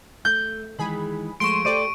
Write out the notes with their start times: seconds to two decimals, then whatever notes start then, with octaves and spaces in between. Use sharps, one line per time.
0.25 A3 G6
0.79 D#3 E3 G#3 G#4 B5
1.40 F3 G#3 A3 C6 C#6 D7 E7
1.65 A3 G4 A4 C5 D5 D7 D#7